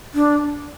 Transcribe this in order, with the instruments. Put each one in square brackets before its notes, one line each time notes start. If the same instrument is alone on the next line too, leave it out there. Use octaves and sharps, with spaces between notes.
[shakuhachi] D4